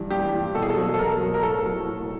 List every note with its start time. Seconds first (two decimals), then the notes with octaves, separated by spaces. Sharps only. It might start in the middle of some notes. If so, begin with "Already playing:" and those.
Already playing: G2 E3 G3
0.10 G2 G4
0.33 E3 G3
0.55 B2 A4
0.62 G#4
0.69 A4
0.77 F#3
0.94 A4
0.99 B2 A#4
1.21 F#3
1.34 A#4
1.43 A2 A4
1.65 F#3
1.87 A2